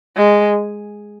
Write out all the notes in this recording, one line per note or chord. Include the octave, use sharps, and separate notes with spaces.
G#3